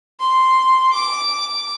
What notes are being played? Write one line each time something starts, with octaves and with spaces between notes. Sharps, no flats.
C6
D6